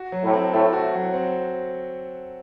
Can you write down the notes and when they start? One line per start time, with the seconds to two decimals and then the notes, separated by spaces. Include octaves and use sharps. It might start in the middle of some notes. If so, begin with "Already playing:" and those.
Already playing: F#4
0.12 F#3
0.23 A2
0.33 C4
0.53 A2 A4
0.73 F#4
0.93 F#3
1.13 C4